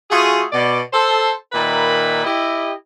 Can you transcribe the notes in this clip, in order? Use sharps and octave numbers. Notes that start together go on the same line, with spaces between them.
A3 F4 F#4 G#4
B2 D5
A4 C5
A#2 D#3 A#4 B4 E5 B5
E4 G4 D#5